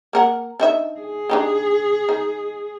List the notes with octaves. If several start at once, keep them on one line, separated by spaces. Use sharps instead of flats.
A#3 A#4 F#5
D4 D#4 E5
G#4
D4 D#4 G4
D#4